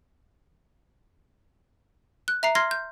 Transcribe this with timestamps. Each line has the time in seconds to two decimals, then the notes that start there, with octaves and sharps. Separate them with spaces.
2.28 F#6
2.43 E5 A#5 C7
2.55 C6 F6 G#6 A#6 C7
2.71 G6